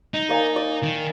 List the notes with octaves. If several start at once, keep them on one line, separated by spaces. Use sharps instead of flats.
D#4
A#3 D5 G#5
D5
D#3